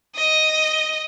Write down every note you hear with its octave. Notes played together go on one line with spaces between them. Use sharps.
D#5